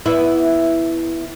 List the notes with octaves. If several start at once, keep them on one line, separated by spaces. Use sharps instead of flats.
B3 E4